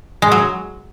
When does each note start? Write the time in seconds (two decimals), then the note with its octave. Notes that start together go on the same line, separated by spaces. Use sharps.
0.22 G#3
0.32 F#3